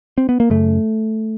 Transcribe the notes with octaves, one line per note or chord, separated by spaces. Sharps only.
C4
B3
A#3
F#2 C#3 A3